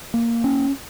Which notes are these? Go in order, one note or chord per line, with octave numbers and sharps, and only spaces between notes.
A#3
C#4